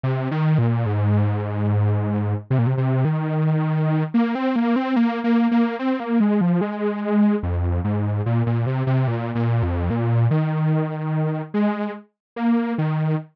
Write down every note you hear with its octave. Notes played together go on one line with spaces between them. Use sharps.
C3
D#3
A#2
G#2
C3
A#2
C3
C3
D#3
A#3
C4
A#3
C4
A#3
A#3
A#3
C4
A#3
G#3
F3
G#3
F2
G#2
A#2
A#2
C3
C3
A#2
A#2
F2
A#2
D#3
G#3
A#3
D#3